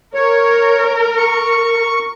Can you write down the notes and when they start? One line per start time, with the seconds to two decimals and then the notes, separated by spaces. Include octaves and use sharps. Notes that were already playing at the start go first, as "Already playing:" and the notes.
0.14 A#4 C#5
1.17 C#6